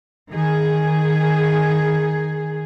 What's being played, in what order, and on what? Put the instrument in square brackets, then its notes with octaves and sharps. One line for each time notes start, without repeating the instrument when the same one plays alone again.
[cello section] D#3 G#4